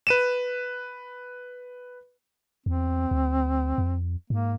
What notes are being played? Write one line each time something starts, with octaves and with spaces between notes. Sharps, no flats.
B4 D#7 E7
E2 C4
D2
F2
G#2 A#3